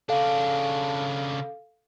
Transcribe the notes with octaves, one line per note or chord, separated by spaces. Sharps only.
C#3 D4 A4 F5